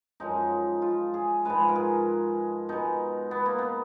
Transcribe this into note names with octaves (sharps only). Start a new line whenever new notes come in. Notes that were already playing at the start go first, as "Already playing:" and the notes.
F#2 F3 G#3 D#4
F4
G#4
G#2 F3 G#3 B4
A#4
G#4
B2 G#3 D#4
B3
A#3
B3